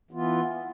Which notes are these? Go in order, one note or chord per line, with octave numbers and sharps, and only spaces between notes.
E3 B3 F4